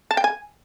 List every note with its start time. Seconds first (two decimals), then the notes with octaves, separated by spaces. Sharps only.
0.11 A5
0.17 G5
0.24 G#5